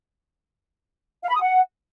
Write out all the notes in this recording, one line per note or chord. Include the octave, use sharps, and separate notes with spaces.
F5
B5
D#6
F#5